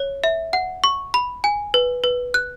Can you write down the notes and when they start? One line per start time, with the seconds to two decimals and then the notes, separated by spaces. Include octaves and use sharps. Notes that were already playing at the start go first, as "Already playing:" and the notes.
Already playing: C#5
0.24 E5
0.53 F#5
0.84 C#6
1.14 B5
1.44 G#5
1.74 B4
2.04 B4
2.34 F#6